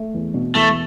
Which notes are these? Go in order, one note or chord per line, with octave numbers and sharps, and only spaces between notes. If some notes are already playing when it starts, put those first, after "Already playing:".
Already playing: A3
E2
B2
E2 A3